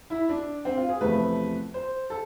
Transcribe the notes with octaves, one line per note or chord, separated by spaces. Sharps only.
E4
D4
C4
F4
G#4
E2 C3 F3 A3 B4
C5
A4